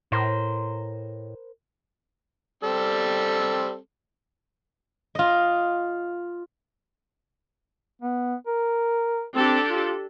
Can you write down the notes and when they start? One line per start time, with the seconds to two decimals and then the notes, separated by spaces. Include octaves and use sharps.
0.12 A2 A#4 C5
2.64 G3 C4 A4
5.15 F4 D#5
8.02 B3
8.47 A#4
9.35 C4 D4 G4 A4
9.70 F4